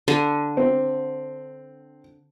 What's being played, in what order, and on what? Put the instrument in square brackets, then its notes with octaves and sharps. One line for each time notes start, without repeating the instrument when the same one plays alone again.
[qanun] D3
[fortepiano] C4